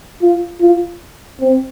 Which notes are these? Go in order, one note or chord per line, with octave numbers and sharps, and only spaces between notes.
F4
F4
C4